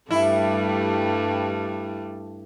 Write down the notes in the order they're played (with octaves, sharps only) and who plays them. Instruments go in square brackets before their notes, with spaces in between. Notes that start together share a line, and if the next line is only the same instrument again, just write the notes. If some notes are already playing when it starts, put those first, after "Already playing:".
[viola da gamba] G2 G3 A3 [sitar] E4